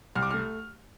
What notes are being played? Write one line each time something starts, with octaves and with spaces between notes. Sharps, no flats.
C2 F6
D6
A3 F6